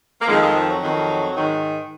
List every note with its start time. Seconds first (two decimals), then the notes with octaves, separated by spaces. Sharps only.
0.20 A#3
0.27 F2 D#3 F3 G#3
0.41 F3 G#3
0.54 F3
0.67 F#3
0.81 F2 D#3
1.33 G#2 D#3